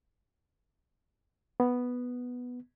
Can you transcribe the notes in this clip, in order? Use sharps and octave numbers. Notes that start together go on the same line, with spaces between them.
B3